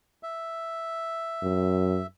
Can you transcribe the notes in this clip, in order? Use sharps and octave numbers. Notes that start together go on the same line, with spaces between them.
E5
F#2